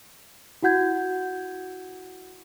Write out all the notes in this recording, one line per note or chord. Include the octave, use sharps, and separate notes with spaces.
E4 F#4 F#5 G6 G#6